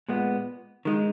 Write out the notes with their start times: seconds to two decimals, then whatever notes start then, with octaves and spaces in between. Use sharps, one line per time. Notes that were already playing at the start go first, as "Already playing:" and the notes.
0.09 A#2 G#3 B3
0.85 D#3 G#3 D#4